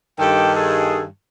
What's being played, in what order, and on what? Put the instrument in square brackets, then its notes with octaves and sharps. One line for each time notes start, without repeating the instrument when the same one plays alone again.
[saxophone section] G2 D#3 [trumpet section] G4 A4 G5
[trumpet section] G#4 A4